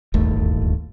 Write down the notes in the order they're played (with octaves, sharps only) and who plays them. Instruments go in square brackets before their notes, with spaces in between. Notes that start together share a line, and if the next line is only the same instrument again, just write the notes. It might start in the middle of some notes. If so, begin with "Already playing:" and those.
[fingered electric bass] D1 G1 D#2 A3